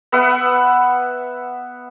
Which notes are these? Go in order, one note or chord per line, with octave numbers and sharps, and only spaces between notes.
B3 E5 F#5